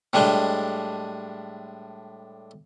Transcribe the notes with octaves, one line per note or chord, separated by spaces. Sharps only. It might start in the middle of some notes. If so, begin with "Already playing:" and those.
A2 G3 G#3 D4